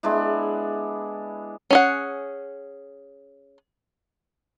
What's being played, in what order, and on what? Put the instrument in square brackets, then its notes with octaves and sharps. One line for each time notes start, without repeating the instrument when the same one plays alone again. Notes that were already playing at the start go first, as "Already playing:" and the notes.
[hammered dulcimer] G#3 B3 D4 E4
[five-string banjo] C#4 G#4 F#5